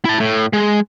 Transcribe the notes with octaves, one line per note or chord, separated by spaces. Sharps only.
E4 A5
A2
G#3